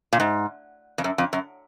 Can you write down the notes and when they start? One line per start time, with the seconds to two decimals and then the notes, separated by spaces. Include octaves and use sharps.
0.13 A#2
0.20 G#2
0.98 F2
1.04 F#2
1.18 F2
1.33 F#2